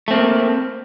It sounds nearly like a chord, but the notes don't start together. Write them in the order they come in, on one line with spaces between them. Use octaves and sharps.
A3 C4 A#3